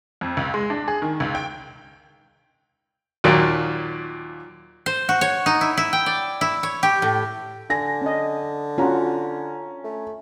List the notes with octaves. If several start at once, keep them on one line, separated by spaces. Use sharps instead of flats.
F2
C#2
G#3
D4
G#4
D#3
C#2
G5
D#2 A#2 F#3
C5
F#4
C#5
D#4
E4
E4
G5
D5
E4
C#5
G4
A2
D3 G#5 A#6
C#4 D#5
C#4 F4 F#4 A#5
A3